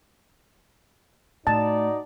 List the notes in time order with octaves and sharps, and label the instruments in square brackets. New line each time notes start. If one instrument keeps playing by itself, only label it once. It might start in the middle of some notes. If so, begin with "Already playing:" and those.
[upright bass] A2 [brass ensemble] D#4 F#4 D5 [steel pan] A5